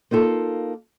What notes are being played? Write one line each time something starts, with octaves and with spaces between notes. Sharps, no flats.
A#3 D#4 F4 A4